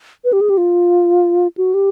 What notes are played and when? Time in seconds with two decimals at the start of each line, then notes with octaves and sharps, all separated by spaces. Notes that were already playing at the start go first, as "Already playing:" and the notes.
0.24 B4
0.33 G4
0.41 G#4
0.49 G4
0.57 F4
1.57 F#4
1.74 G4